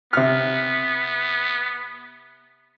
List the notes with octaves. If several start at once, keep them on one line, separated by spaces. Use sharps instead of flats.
C3 B3 F6